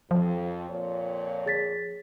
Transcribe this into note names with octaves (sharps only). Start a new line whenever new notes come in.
F2 F3
F2 A#2 C#5
G#4 A6 B6